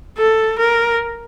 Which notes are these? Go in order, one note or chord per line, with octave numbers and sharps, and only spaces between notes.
A4
A#4